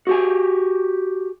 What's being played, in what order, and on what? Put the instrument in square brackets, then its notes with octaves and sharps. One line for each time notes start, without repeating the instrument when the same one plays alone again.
[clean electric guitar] F#4 G4 G#5